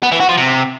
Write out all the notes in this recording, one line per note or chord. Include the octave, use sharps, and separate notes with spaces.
B3
E3
F#4
F3
C3